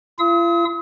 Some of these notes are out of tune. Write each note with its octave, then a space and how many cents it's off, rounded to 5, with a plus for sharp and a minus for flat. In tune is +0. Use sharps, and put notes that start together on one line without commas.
F4 -45 F5 -40 D#6 +45